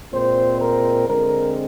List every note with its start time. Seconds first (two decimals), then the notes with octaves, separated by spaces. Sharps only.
0.13 A#2 G#3 C4 C5
0.61 A#4
1.08 D3 G#3 C4 A#4